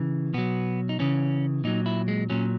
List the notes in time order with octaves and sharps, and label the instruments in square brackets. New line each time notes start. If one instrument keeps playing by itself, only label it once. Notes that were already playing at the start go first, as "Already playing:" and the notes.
Already playing: [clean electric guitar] C#3 E3
B2 F#3 B3
D#4
C#3 E3 C#4
A#2 F#3 D#4
E4
G#3
A#2 F#3 C#4